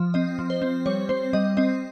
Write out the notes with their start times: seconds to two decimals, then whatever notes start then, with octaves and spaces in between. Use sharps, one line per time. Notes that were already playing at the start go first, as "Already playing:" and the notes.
Already playing: F3
0.14 C4 D#5
0.39 F3
0.50 C5
0.62 C4
0.86 G3 C#5
1.09 C4 C5
1.33 G3 D#5
1.57 C4 D#5